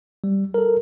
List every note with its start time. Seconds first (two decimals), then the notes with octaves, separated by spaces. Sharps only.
0.24 G3
0.54 A4 A#4